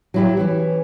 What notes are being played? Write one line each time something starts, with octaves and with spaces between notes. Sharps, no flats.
F#3 E4 G4
E3 C#4